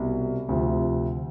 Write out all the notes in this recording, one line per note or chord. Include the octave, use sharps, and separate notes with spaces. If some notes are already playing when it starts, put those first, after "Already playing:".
Already playing: C2 B2
D2 C3 F3